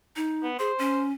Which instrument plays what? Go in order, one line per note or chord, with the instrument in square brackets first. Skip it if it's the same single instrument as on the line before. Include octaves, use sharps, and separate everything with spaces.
[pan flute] D#4
[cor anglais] B3
[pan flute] G#4 [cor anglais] C5
[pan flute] C#4